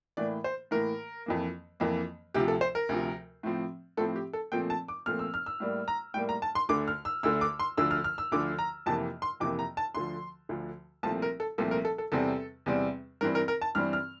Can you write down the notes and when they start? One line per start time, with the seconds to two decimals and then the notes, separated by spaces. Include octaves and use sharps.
0.17 A2 E3 A#3 D5
0.44 C5
0.71 A2 E3 A#3 A#4
1.26 F2 E3 A#3
1.80 F2 E3 A#3
2.34 D2 C3 F3 G4
2.48 A4
2.61 C5
2.75 A#4
2.89 D2 C3 F3
3.43 A2 F3 C4
3.97 A2 F3 C4 A4
4.16 G4
4.33 A4
4.52 A#2 F3 A3 C4 G5
4.70 A5
4.88 D6
5.06 A#2 F3 A3 C4 F6
5.19 E6
5.34 F6
5.46 E6
5.60 A2 G3 A#3
5.88 A#5
6.14 A2 G3 A#3 G5
6.29 A#5
6.42 A5
6.55 C6
6.69 D2 D3 A3 D6
6.88 F6
7.05 E6
7.23 D2 D3 A3 E6
7.41 D6
7.59 C6
7.78 D2 D3 F3 E6
7.91 F6
8.04 F6
8.18 E6
8.32 D2 D3 F3 D6
8.59 A#5
8.86 F2 C3 E3 A#3 A5
9.22 C6
9.40 F2 C3 E3 A#3 D6
9.59 A#5
9.77 A5
9.95 D2 D3 F3 C6
10.49 D2 D3 F3
11.03 C2 A#2 F3 A3 C4 A5
11.22 A#4
11.40 A4
11.58 C2 A#2 F3 A3 C4 A4
11.71 A#4
11.85 A4
11.98 A4
12.12 E2 C3 G3 C4 A4
12.66 E2 C3 G3 C4
13.21 G2 E3 G3 C4 A#4
13.35 A#4
13.48 A#4
13.61 A5
13.75 G2 E3 G3 C4 F6
13.93 F6